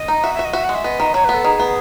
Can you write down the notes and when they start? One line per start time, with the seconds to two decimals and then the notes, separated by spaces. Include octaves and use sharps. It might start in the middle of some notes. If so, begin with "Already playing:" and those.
Already playing: D#5
0.08 D#4
0.23 F#4 E5
0.34 F#4 E5
0.44 D#5
0.53 F#4 E5
0.64 F#5
0.69 G#3
0.75 E5
0.84 B3 D#5
1.00 D#3
1.14 F#3 C#5
1.24 B3 B4
1.34 A4
1.44 D#3 G#4
1.59 B3